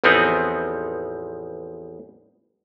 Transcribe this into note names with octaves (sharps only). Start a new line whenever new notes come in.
A1 E2 F3 B3 C4 D#4